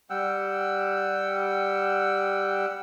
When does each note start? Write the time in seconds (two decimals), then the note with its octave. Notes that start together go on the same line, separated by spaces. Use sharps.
0.10 G3 F#5 G5 E6